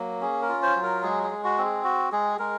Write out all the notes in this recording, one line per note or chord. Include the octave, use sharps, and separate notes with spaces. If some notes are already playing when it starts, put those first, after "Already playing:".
Already playing: F#3 A#3
C#4 G#4
A#4
F4
C5
F#3
A#4
G#3 G#4
G#4
G#3
F#4
C4
G#4
F#4
G#3 G#4
G#3 A#4